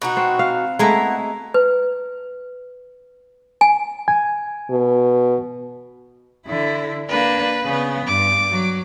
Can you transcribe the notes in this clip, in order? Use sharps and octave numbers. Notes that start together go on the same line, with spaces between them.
B2 D#4 F#4
C4
F5
G#3 A3 B3 E4 A#5
B4
G#5
G#5
B2
D3 E4
A#3 D4 B4
C#3 B3
G2 D6
F#3